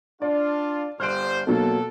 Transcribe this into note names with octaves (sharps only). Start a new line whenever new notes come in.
D4 F4 D5
G1 G3 C5 F6 F#6 D7
B2 F#3 A#3 A4